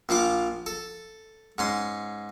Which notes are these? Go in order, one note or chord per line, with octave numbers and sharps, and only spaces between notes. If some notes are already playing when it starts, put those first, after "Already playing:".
A#1 F3 F4 D6
A4
G#2 C#4 C6